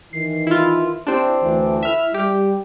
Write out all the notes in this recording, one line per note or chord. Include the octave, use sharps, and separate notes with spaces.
D#3 E3 C7
E4 F4
C4 D4 E4 G4
D2 E3
E4 E5 F6
G3 G4